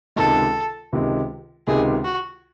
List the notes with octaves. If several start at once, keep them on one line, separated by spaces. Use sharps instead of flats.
C#2 C3 D#3 G#3 A4
C#2 C3 D#3 G#3
C#2 C3 D#3 G#3 G#4
F#4